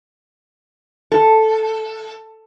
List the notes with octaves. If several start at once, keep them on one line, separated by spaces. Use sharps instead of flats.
A4